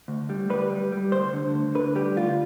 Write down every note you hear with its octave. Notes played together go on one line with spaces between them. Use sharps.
D2
G3
G3 B4
G3
G3
D2 C5
D3
D2
D3 B4
G3 G4
D2 F4